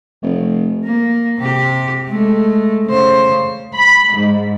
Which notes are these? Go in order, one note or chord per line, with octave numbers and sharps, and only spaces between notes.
F1
A#3
C3 G4
G#3 A3
C#3 C5
B5
G#2